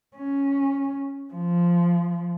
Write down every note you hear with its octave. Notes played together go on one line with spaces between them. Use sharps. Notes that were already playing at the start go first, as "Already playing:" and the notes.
C#4
F3